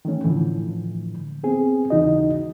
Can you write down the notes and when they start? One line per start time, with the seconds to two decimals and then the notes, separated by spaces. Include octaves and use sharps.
0.05 D#3 E3 A3 C#4
0.24 A2 D3 E3 F3
1.44 B3 C4 G#4
1.90 D#2 C#3 E3 D#4 F#4 D#5